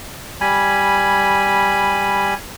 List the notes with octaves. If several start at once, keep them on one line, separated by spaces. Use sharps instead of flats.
G3 G#5 B5